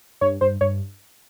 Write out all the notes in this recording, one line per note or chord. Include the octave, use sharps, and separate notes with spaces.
G2 C#5
G2 C5
G2 C#5